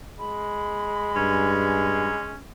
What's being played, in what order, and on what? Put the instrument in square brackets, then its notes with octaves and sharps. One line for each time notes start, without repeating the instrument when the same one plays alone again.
[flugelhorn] G#3 [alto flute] B5
[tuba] G2 [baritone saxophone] C#4